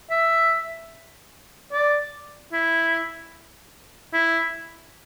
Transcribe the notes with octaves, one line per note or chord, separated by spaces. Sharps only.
E5
D5
E4
E4